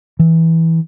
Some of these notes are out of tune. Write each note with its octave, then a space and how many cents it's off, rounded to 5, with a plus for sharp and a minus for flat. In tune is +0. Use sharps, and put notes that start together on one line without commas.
E3 -15